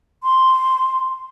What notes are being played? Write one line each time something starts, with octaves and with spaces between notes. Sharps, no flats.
C6